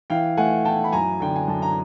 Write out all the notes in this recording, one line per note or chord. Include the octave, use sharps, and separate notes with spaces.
E3 F5 G5
A3 F#5 G#5
E4 G5 A5
B5
F#2 G#5 A#5
D3 G5
G#5
F#2 A5
A#5